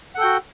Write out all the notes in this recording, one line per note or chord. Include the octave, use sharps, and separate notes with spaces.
F#4 A4 F#5 G5